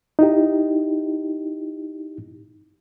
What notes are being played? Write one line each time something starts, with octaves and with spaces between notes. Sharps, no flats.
D#4 E4 G4